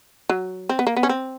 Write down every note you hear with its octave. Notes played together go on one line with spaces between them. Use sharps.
F#3
C4
B3
A#3
B3
C#4
C4